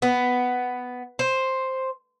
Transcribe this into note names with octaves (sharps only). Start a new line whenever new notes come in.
B3
C5